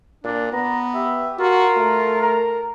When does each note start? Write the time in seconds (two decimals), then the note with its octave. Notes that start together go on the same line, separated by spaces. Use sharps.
0.24 A#2 D4
0.53 B3 A#5
0.94 G4 E5
1.39 F4 F#4 A#4
1.77 A3
2.21 A#4